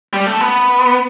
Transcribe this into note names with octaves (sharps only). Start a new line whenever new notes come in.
G3
A3
B3